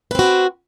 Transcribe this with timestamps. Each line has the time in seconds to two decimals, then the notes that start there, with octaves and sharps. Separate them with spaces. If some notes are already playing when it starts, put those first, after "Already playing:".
0.11 B4
0.15 C4
0.19 F#4